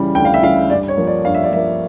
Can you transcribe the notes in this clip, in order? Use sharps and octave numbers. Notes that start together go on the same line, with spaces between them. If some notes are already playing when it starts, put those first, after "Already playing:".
Already playing: C#3 E3 G3
D2 G5
F5
E5
C#3 E3 G3 F5
G2 D5
C#5
F3 A#3
D5
G2 F5
E5
D5
F3 A#3 E5